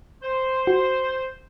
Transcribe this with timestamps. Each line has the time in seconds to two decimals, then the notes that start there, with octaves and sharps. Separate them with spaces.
0.23 C5
0.67 F#4